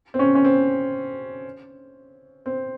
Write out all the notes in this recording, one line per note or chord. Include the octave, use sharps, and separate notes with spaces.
C4
C#4
C#4
C4
C4